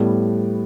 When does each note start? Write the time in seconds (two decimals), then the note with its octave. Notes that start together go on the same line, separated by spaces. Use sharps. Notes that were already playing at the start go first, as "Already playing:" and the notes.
Already playing: A2 G3 B3